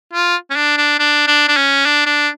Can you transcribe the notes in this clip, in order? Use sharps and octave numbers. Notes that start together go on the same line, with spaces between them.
F4
C#4
D4
D4
D4
D4
D4
C#4
D4
D4